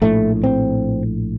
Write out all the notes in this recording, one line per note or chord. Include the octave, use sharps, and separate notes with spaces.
A#1 A2 A3
C4